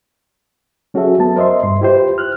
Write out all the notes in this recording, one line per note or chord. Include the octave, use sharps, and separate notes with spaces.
F#3 C#4 F#4 G#4 A4 E5
F#3 B3 A5
A#4 C5 D#5 E5 C6
G2 C6
E4 F4 G4 B4 C5
F6 F#6